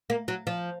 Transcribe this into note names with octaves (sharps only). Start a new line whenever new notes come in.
A#3
F#3
F3